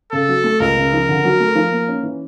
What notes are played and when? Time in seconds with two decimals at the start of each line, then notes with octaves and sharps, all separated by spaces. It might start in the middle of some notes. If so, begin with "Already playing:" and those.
0.12 C#3 A4
0.29 F#3
0.44 A3
0.60 C#2 A#4
0.77 C#3
0.93 F3
1.09 D3
1.25 F#3
1.40 A3
1.55 F3
1.71 A#3
1.88 C#4
2.03 E3